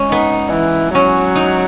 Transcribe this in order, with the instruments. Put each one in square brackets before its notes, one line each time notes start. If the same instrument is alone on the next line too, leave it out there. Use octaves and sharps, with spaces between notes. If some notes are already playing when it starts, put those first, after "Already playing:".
Already playing: [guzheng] G#3 C#4
[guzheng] B3 [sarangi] D#4
[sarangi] E3
[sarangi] F#3 [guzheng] C#4
[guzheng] D#4